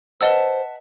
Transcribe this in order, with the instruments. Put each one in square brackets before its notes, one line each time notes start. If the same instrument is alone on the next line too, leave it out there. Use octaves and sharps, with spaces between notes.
[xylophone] B4 D#5 E6 [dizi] C5 [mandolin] E5 F#5 A5